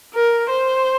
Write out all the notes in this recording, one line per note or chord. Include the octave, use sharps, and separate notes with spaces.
A#4
C5